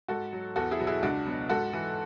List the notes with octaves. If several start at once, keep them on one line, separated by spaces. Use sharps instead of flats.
G#2 F#4 A4
F#3
E2 F#4 A4
E4 G#4
B2 F#3
E4 G#4
C#2 D4 F#4
B2 F#3
G#2 F#4 A4
E3